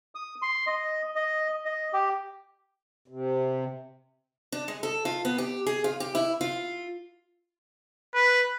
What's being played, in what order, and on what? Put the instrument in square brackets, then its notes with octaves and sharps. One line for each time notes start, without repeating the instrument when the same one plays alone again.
[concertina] D#6
C6
D#5
D#5
D#5
G4
[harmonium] C3
[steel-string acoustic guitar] D4
G#3
A4
F4
B3
G4
G#4
F4
G4
E4
F4
[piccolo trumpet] B4